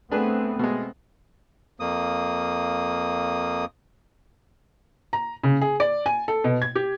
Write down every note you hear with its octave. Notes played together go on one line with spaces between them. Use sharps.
A3 B3 C4 D4 G#4 B4
B2 G#3
F2 A#3 D#6
A#5
C#3
G#4
D5
G#5
A4
B2
G#6
G4